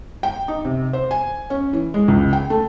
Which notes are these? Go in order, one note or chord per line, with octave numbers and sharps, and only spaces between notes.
G5
D#4
C3
C5
G#5
C#4
E3
G#3
C#2
G5
A3